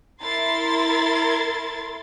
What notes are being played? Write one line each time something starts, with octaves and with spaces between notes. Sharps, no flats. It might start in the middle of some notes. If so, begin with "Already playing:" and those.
E4 A#4 C6 A6